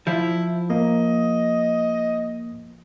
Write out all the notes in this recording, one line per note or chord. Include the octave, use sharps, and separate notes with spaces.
F3 E4
A#3 D#5